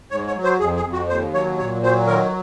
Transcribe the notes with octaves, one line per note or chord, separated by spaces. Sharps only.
G#2 C#5
C#5
F#3
C5
F2 G#4
G#4
F2
F#4
D#2 C5
F#3 C#5
A#2 C#5
F#3 C5
D#3 A#4